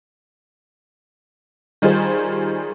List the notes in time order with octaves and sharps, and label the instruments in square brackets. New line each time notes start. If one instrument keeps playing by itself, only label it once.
[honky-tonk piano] D#3 G3 F4 G#4 C5